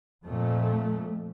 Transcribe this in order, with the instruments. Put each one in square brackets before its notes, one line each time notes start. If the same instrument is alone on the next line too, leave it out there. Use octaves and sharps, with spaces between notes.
[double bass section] F2 A#2 A3